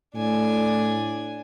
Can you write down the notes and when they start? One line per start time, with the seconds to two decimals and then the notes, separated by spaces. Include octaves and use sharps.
0.15 A2 D4 G#5